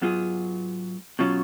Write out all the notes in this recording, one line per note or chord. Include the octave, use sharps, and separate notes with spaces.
G#2 F#3 B3 F4 G#4
B2 F#3 C#4 F4